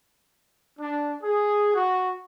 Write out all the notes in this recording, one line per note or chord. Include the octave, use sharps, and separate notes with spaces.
D4
G#4
F#4